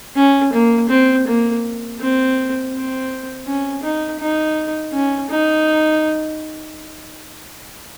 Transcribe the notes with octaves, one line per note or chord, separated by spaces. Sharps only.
C#4
A#3
C4
A#3
C4
C4
C#4
D#4
D#4
C#4
D#4